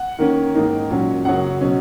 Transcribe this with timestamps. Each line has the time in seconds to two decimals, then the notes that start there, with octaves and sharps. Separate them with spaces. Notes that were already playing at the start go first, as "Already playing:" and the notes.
Already playing: F#5
0.19 D#3 A#3 C#4
0.54 G#2 D#3 A#3 D#4
0.90 A#2 F#3 C#4
1.25 F#2 C#3 F#3 C#4 F#5
1.61 B2 F#3 C#4